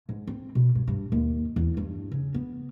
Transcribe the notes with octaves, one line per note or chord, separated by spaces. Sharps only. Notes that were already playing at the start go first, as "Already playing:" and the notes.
G#2
C4
B2
G2
G2
D#2
E2
G2
C#3
B3